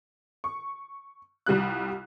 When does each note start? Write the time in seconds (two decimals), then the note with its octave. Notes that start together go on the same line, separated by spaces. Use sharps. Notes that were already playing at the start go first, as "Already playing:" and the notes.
0.44 C#6
1.46 C2 G3 F4 F#6